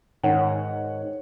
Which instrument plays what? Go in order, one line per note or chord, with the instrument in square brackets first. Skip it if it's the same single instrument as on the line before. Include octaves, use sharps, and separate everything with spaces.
[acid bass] G#2 [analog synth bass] D#3 [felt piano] C#5 [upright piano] F#5